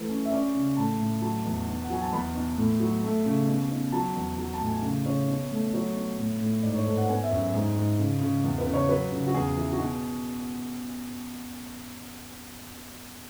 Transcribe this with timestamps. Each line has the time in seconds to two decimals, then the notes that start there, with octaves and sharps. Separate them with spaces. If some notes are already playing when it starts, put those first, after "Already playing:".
Already playing: E3 A3 B4
0.09 C#4
0.25 E5
0.32 C#4 D5
0.55 C#3
0.77 A2 A5
1.00 A2
1.22 F#3 A5
1.45 E2
1.68 B2
1.83 F#5
1.90 F#3 G#5
2.02 A5
2.12 E2 B5
2.35 B2
2.57 A2
2.80 F#3
3.03 A3
3.26 C#3
3.48 B2
3.71 B2
3.92 F#3 A5
4.16 E2
4.38 F#3
4.54 A5
4.61 A2
4.67 G#5
4.83 C#3
5.06 C#3 C#5
5.28 B2
5.51 A3
5.73 F#3 C#5
5.96 B2
6.18 A2
6.41 A2
6.63 G#2 D5
6.74 C#5
6.86 G#2 A4
6.97 F#5
7.09 B3 G#5
7.23 E5
7.31 F#2
7.39 G#4
7.54 G#2 G#4
7.76 G#2
7.98 C#3
8.21 C#3
8.44 E2
8.58 B4
8.66 C#3
8.74 C#5
8.89 F#3 B4
9.12 C#3
9.27 F#4
9.34 E2 G#4
9.57 E3
9.72 F#4
9.79 B2 G#4